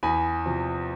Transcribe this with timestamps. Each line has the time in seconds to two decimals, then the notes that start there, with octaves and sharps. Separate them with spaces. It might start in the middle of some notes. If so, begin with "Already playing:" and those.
0.03 E2 G#5 B5
0.46 C3 F3